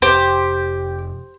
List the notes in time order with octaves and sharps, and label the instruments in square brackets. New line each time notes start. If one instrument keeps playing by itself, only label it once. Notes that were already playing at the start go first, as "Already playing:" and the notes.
[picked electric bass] F1 [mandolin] G4 [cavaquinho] C5